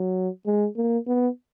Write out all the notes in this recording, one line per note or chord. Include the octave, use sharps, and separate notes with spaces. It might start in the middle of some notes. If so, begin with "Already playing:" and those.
Already playing: F#3
G#3
A#3
B3